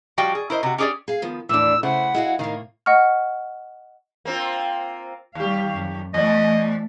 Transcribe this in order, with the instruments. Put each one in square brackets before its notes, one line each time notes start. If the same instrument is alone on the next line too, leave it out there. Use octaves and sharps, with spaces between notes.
[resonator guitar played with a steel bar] F3 G3 F#4 F5 G5
G#4
E4 A#4 C5 D#5
C3 F#4
C#4 G4 G#4 C#5 D5
[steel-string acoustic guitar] G#4 F5
D#3 F3 B3
[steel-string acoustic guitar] D#2 A2 [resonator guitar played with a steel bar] E3 D4 [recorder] E6
[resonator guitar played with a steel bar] C#3 A3 E4 [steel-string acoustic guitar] C5 [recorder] F#5
[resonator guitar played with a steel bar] G#3 [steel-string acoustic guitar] E4 F#4 F5
[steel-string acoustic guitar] A2 A#3 [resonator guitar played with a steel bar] D#3 A#4 F5
[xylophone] D#5 F#5 C#6 F6
[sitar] A#3 C4 F4
[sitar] D#2 G4 [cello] G3 F5
[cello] F#2
[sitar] E2 D5 [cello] A3 [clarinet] D#5